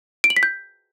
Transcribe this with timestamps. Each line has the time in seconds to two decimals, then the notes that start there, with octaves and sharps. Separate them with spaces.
0.24 D7
0.30 F#7
0.36 B6
0.43 G6